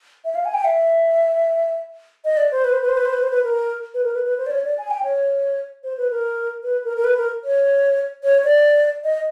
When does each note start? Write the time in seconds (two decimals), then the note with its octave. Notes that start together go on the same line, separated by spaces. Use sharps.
0.25 E5
0.35 F5
0.45 G#5
0.54 G5
0.64 E5
2.25 D#5
2.37 D5
2.52 C5
2.64 B4
2.73 C5
2.82 B4
2.89 C5
2.97 B4
3.05 C5
3.13 B4
3.23 C5
3.31 B4
3.44 A#4
3.94 B4
4.04 A#4
4.14 B4
4.24 B4
4.38 C5
4.46 D5
4.51 C#5
4.64 D5
4.78 G#5
4.90 G5
5.04 C#5
5.84 C5
5.97 B4
6.11 A#4
6.63 B4
6.84 A#4
6.97 A#4
7.04 B4
7.18 A#4
7.44 C#5
8.24 C#5
8.44 D5
9.04 D#5